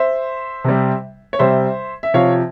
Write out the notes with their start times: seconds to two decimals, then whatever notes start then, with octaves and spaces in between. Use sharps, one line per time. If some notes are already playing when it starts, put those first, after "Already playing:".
Already playing: C5 E5
0.64 C3 G3
1.33 C#5
1.39 C3 G3 C5 E5
2.03 E5
2.14 C3 F3 C#5 F5